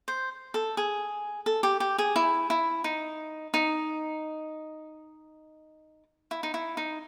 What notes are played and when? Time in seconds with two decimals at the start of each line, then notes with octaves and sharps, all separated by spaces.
0.08 C5
0.54 A4
0.77 G#4
1.46 A4
1.63 G4
1.80 G4
1.98 G#4
2.16 E4
2.50 E4
2.84 D#4
3.54 D#4
6.31 E4
6.43 D#4
6.54 E4
6.77 D#4